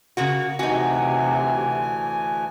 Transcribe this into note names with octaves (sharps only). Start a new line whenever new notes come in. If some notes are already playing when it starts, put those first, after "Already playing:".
C#3 A#3 F#4
D2 C3 E3 D#4 F#4 G#5